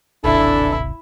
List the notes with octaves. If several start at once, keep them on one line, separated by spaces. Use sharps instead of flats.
D1 G#1 C3 E3 D4 E4 A4